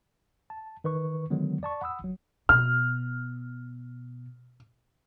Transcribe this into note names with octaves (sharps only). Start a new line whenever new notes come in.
A5
D#3 B4 C#6
D3 D#3 F#3 G#3 B3
D5 A5 C#6
F#5 B5 D#6 E6
G1 F#3
B2 F6